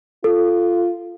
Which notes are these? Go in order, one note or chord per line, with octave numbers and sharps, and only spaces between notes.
F4 A4